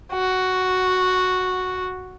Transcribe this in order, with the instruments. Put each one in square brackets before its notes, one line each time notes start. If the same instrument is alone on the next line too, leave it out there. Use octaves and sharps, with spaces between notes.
[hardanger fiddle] F#4